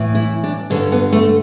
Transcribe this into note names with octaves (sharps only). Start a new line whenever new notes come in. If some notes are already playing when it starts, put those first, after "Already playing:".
Already playing: A2 E3
E4
D4
G2 D3 C#4
B3
A3